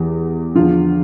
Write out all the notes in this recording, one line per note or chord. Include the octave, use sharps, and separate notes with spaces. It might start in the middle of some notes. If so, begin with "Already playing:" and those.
Already playing: E2 E3 G4
E2 D3 F3 F4